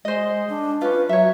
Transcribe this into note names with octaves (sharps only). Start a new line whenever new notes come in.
G#3 C5 D#5
D4
C#4 F4 B4
F#3 C#5 E5